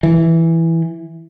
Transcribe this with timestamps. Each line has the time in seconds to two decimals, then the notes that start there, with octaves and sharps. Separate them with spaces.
0.03 E3